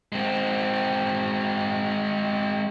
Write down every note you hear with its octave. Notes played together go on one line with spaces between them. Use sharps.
G#3 C4